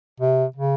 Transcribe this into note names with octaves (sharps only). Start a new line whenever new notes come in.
C3
C#3